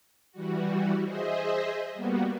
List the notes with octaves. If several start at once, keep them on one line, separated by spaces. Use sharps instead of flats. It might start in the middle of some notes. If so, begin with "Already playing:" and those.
E3 G3 F#4
G#4 C5 D#5 E5
G3 A#3 B3 F#4